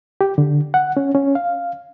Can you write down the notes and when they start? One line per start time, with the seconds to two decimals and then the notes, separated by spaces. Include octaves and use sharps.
0.21 G4
0.38 D3
0.74 F#5
0.97 C#4
1.15 C#4
1.35 F5